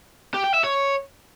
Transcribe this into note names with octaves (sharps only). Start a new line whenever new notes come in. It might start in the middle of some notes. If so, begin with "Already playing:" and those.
G4
G5
E5
C#5